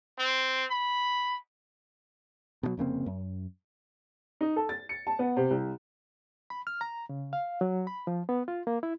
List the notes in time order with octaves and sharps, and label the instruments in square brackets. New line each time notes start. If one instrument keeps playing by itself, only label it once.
[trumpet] C4
B5
[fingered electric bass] B2 D3 F#3
F1 C#3 A#3 C4
F#2
[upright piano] D#4
A4
A6
C#7
A5
B3
C3
C2
[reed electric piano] B5
F6
A#5
C#3
F5
F#3
B5
F3
B3
F4
A#3
E4